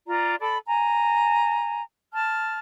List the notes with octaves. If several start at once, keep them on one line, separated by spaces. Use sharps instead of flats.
F4 D5 A#5
A4 D5 B5
G#5 A#5
A5 F6